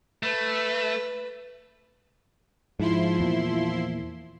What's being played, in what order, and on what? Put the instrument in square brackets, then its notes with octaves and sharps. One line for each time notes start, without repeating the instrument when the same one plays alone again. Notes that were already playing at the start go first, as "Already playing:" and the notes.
[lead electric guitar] A3 [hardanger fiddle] B4
[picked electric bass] G#2 [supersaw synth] F3 E4 C6
[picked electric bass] E2 A#2